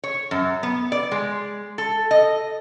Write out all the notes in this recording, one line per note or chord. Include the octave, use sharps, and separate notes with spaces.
C#5
F#2
B3
D5
G#3
A4
D#5